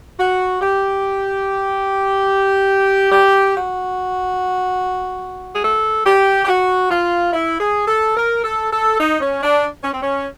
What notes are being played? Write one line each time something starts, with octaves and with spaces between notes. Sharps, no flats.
F#4
G4
G4
F#4
G#4
A4
G4
G4
F#4
F4
E4
G#4
A4
A#4
A4
A4
D#4
C#4
D4
C#4
C4
C#4